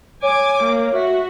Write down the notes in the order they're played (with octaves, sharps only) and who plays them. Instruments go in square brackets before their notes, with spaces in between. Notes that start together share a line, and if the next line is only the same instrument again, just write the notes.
[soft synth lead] C#5 [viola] G#5 D6
[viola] A#3
[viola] F#4 [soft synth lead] E5